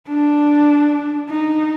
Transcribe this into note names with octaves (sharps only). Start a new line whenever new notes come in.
D4
D#4